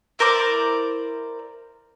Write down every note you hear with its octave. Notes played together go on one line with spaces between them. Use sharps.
E4 A#4 C5 D5